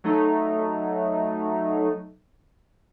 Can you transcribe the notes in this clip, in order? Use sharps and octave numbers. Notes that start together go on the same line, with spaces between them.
F#3 A3 D#4